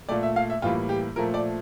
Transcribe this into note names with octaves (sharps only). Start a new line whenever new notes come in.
A#2 A3 D5
E5
F5
E5
A2 E3 G3 A#3 F4
G4
A#2 F3 A3 A#4
D5